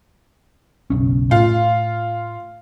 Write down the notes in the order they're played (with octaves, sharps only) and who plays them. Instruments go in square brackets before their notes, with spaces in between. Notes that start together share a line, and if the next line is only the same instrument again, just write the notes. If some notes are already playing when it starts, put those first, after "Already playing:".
[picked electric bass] F#1 B1 C#4
[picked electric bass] A2 [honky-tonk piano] F4